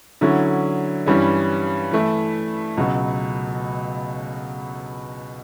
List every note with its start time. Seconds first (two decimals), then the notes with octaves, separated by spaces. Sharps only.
0.21 D3 F#3 C#4 E4
1.06 G2 E3 G3 C#4
1.92 E3 A3 E4
2.77 C#2 B2 F#3